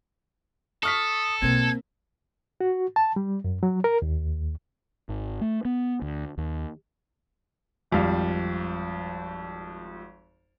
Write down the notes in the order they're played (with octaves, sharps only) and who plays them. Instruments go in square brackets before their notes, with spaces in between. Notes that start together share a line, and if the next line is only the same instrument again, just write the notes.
[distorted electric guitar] A4 [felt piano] C#6 F6 B6 [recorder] D#6
[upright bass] B1 B2 [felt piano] A#3 C4 [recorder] G#6
[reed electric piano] F#4
A5
G3
F#2
F#3
A#4
D#2
[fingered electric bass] G#1
A3
B3
D2
D#2
[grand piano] G#1 F2 G3 F5